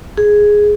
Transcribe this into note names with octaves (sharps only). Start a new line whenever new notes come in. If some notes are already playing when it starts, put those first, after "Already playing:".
G#4